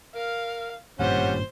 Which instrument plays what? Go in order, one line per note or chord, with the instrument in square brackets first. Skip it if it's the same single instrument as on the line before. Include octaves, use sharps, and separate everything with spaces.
[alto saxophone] A#4 [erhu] F5
[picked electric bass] G#1 G2 A#2 [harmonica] G3 C#4 [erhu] C5 [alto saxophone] F#5